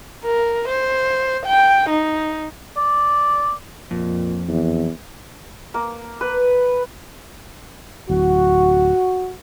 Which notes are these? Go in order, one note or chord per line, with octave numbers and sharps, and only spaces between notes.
A#4
C5
G5
D#4
D5
F2 A#2
E2
A#3
B4
D1 F#4